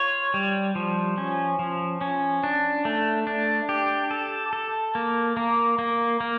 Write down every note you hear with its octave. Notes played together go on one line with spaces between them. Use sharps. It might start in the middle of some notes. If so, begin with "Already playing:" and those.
Already playing: F4 C#5
G3
F3
C#4
F3
C#4
D4
A3
D4
G4
A4
A4
A#3
A#3
A#3
A#3